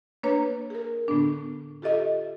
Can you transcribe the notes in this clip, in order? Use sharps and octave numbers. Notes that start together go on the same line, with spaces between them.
A#3 D4 B4 C#5 A#5
G#4 A#4
A2 D3 B3 D4
F4 G4 A4 D#5 E5